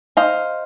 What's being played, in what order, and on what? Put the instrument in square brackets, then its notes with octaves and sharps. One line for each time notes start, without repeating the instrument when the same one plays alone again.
[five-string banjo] D#4 C5 F5